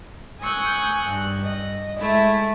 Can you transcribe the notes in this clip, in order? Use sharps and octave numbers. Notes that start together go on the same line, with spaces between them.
G#5 C#6 D#6 E6 F#6 G6
G2 F#6
D#5
G#3 A3 E4